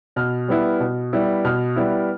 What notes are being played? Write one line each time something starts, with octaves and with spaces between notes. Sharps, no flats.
B2 F6
G3 B3 E4
B2
G3 B3 E4
B2 F6
G3 B3 E4